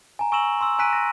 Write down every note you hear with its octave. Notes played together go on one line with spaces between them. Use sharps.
G#5 A#5
G#5 C#6 E6 A#6 E7 F#7
C6 E6
G#5 A#5 F#6 B6 D7 D#7
A#6